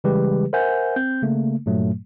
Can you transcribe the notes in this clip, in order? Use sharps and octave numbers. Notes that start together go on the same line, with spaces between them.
C#3 E3 G3 G#3 G4 B4
A#4 C5 E5 F#5 G#5 G6
C4 G6
C#3 A3 A#3
G2 A#2 F#3 A3